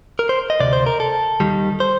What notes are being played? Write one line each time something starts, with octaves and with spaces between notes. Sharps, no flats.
A#4
C5
D#5
D2 C3 D5
C5
A#4
A4
D#2 D#3 G3
C5